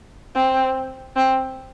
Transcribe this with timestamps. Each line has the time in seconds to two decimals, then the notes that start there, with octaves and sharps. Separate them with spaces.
0.35 C4
1.16 C4